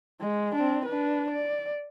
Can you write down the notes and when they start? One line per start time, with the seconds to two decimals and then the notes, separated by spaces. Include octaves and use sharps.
0.21 G#3
0.55 C4 D4
0.85 D4 B4
1.30 D5